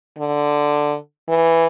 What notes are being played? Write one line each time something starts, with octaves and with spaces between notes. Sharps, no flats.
D3
E3